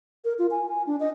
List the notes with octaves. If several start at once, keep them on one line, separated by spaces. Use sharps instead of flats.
A#4
F4
G#5
G#5
D4
D#5